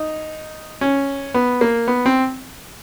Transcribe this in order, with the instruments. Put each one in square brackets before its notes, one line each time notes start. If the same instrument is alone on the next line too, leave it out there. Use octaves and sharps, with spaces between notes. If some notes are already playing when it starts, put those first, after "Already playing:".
Already playing: [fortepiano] D#4
C#4
B3
A#3
B3
C4